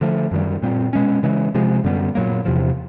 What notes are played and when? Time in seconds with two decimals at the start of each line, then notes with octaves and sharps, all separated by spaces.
0.01 D3 F3 A3
0.31 F#2 D#3 G3
0.62 A#2 G3 C4
0.93 B2 G#3 C#4
1.23 C#3 E3 G#3
1.55 C3 F3 G#3
1.84 F#2 D3 G3 B3
2.15 A#2 F#3 A#3
2.45 E2 C3 F3